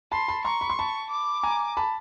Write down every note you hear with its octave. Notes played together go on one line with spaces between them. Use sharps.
A5 B5 C6
A5 B5
A#5 C6 C#6
B5
C6
A5 B5
D6
G#5 A#5
A5 B5